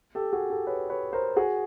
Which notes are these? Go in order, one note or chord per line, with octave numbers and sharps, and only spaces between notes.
G4 A4
F#4 G#4
G4 A4
B4 C#5
B4 C#5
A#4 C5
F#4 G#4